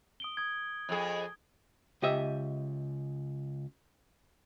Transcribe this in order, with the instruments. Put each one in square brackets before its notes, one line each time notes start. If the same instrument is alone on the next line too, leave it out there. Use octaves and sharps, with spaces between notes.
[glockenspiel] D#6 D7 G7
D#6 G#6
[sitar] F2 G#4
[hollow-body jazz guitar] C#2 G4 D#5 E5